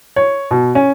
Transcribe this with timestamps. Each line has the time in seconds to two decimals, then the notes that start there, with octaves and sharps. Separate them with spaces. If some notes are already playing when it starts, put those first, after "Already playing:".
0.16 C#5
0.51 B2
0.75 C#4